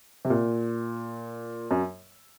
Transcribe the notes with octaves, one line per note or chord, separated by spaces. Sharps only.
C3
A#2
F#2